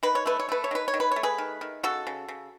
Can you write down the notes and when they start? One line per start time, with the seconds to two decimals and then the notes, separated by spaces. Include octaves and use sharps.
0.03 D#3 B4
0.15 C#5
0.26 A3 B4
0.40 C#5
0.49 A3 B4
0.64 C#5
0.71 D#3 B4
0.88 C#5
0.94 D#3
1.00 B4
1.12 A3 C#5
1.23 G#4 B4
1.38 D#3
1.61 D#3
1.83 C#3 F#4 A4
2.07 C#3
2.28 C#3